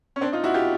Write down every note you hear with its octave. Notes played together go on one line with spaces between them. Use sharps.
C#4
C4 D4
D#4 F4
E4 F#4
F4 G4